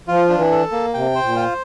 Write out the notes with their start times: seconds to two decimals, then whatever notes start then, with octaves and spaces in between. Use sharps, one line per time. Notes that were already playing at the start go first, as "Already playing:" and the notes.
0.08 F3 F4
0.29 D4
0.37 E3
0.51 A4
0.72 A#3
0.94 C3 G5
1.15 C5
1.22 A#2
1.36 F4